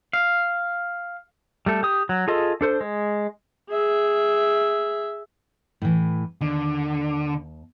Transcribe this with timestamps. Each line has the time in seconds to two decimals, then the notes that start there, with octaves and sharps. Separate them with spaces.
0.13 F5
1.66 G3 A3 A4
1.83 G4 D#6
2.09 F#3
2.28 F4 G#4 A4 D#5
2.61 D4 A4 C5
2.81 G#3
3.70 G#4 E5
5.82 A2 E3
6.41 D#2 D3 A5